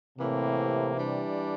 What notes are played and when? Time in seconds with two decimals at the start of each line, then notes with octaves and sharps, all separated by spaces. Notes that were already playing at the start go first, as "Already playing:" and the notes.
0.18 A2 C3 E3 A#3
0.95 E3 G3 D4